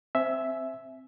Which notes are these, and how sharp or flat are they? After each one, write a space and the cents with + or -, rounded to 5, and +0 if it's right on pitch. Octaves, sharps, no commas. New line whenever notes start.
C4 +0 E5 +0 G#5 +25